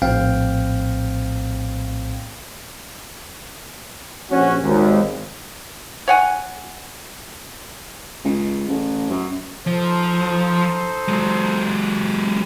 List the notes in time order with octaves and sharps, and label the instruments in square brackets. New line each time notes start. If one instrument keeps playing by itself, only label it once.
[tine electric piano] A#1 A2 C4 F5 G5
[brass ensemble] A#1 C#4 F#4
G#1 D#2
[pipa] C#5 F#5 G#5
[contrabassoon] C#2
A1
F#2
[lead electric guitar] F3 [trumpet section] D#4 A4 C5
[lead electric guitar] F#3 G#3